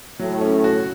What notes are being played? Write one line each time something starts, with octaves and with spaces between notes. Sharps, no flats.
A2 F#3
C#4
F#4